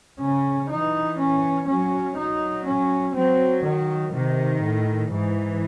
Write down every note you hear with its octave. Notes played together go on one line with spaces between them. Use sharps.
C#3 C#4
E3 D#4
C#4
F#3 C#4
F#3 D#4
C#4
F#3 C4
D#3
C3 D#3
A2
G#2 E3